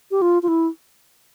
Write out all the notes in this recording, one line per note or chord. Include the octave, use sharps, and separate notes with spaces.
G4
F4
F4
E4